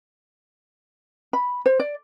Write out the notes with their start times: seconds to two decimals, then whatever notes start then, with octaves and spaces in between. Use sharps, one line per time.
1.33 B5
1.66 C5
1.80 D5